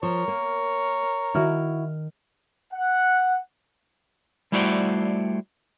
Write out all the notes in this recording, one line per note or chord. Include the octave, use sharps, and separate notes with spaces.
F3 A#4 C#5
A#3
D#3 E4 F#4 F6
F#5
G3 A3 E4 F#4 C5 D5